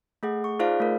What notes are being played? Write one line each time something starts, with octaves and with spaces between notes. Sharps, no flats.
A3 G#4 F#5
C#6
D#4 F4 G#4 C5 D5 F5
A3 A#4